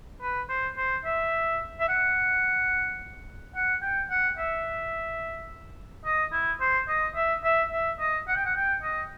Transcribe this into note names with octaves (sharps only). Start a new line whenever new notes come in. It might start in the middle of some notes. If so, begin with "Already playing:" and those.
B4
C5
C5
E5
E5
F#5
F#5
G5
F#5
E5
D#5
E4
C5
D#5
E5
E5
E5
D#5
F#5
G5
F#5
G5
D#5